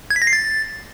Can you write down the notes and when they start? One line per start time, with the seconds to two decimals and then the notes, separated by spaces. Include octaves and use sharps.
0.10 G#6
0.16 B6
0.22 A#6
0.27 C7
0.33 A6